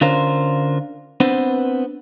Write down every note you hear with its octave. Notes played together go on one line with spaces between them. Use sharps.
D3 C#4 D4 F4 A#4 C5
B3 C4 D4 B4 C5